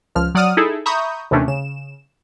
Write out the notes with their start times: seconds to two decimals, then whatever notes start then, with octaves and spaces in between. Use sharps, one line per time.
0.15 C#2 F3 F6
0.35 F#3 D5 F#5 D#6 F6 D#7
0.57 D#4 E4 G#4 A4
0.86 E5 A#5 B5 C#6 D#6 G6
1.31 D#2 C3 E3 A3 C#4 D4
1.48 C#3 E7